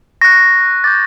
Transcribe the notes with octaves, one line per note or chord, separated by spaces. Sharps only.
C#6 F#6 A#6
D6 G6 A6